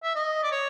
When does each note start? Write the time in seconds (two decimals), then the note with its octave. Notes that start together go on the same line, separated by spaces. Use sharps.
0.03 E5
0.15 D#5
0.43 D5
0.52 C#5